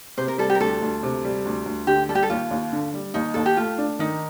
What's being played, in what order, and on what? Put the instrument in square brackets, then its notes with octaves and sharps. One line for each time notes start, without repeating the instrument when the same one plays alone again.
[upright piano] C3 [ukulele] C5
[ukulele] A#4
[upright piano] G3 [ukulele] A4
[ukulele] G4
A#4
[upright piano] D2 [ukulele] A4
[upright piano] D2
C3
G3
D2
D2
[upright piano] D3 [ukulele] G4
[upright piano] G3 [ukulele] A4
[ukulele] G4
A4
[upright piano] D#2 [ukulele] F4
[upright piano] D#2
D3
G3
[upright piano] D#2 [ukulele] D#4
[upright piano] D#2 [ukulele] A4
[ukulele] G4
[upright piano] A3 [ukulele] F4
[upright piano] D4
[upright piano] D#3 [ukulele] D#4